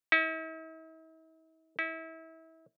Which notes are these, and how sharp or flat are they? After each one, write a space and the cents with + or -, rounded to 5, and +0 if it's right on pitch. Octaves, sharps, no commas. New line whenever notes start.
E4 -45
E4 -30